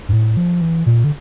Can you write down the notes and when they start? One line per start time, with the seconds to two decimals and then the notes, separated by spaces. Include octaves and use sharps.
0.09 G2
0.13 A2
0.37 F3
0.61 E3
0.86 A#2
1.04 D3